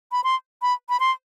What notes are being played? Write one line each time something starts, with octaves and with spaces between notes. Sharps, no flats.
B5
C6
B5
B5
C6